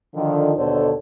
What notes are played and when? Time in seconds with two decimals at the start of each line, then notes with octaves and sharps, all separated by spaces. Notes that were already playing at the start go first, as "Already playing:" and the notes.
0.15 D3 D#3 F3
0.56 D#2 B2 D3 A4 C5 C#5